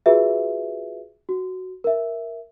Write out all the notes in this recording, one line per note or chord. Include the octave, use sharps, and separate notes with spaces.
F4 F#4 G#4 B4 E5
F#4
A#4 E5